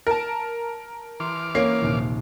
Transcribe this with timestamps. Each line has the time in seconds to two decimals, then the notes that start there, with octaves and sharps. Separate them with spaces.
0.07 A#4 A5
1.20 E3 C6 D6 F6
1.55 A#3 C#4 C7
1.81 A#1 D#2 C3